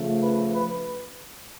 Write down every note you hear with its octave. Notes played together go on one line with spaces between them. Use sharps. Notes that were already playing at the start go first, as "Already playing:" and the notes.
Already playing: C#3 F3 A3
B4
B4